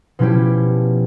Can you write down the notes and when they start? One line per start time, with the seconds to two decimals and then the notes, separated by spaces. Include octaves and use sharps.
0.19 B2 F3 C#4 E4 G4